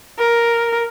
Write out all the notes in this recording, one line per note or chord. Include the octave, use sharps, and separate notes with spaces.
A#4